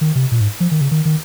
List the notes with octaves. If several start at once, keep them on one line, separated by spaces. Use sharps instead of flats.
D#3
C3
A#2
G#2
F3
D#3
C#3
D#3
D#3